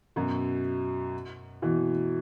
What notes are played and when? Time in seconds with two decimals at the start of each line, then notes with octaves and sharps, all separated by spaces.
0.16 F#2 B2
1.62 B2 E3